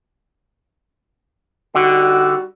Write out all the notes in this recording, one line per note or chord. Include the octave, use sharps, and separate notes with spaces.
D3 G3 D#4 F#4